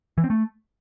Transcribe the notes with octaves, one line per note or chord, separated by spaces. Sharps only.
E3
C4
A3